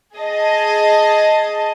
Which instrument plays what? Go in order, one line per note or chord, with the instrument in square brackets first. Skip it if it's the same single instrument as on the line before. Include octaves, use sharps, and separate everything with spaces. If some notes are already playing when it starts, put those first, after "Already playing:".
[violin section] G#4 D#5 A5